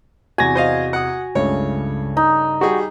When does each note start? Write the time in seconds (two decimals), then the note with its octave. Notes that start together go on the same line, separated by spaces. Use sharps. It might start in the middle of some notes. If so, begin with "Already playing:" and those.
0.38 E2 C3 F#4 G#5 A#6
0.55 C5 D#5 F5
0.93 F#5 D#6
1.35 C#2 G2 C#3 A3 C#5
2.17 D#4
2.61 G3 F#4 G#4